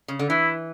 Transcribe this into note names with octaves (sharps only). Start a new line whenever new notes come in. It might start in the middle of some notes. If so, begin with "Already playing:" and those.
C#3
D3
E3 E4